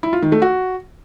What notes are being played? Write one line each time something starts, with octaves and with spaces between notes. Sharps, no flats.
E4
F4
D#3
A3
F#4